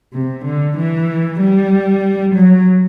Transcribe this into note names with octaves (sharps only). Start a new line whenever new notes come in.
C3
D3
E3
G3
F#3